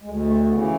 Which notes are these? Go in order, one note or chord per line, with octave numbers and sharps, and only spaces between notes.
D2 G#3
A3
C#3 E3 B3